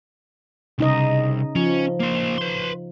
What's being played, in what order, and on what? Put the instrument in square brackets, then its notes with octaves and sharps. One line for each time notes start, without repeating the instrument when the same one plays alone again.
[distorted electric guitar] C2 [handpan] C#3 D#4 D#5
[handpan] F3 [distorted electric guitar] C#4
[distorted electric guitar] A#3 C5
B4 C6